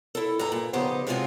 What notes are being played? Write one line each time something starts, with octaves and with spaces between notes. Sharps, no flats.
E4 A4
G2 G#4 A4 A#5
A#2
F2 C#3 B3 D#4 G4 C5
A2 C3 G#3 C4 F4 F#4